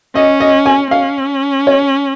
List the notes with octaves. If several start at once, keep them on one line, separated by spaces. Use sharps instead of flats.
C#4 D#5
D#5
G#5
C#4 F5
C#5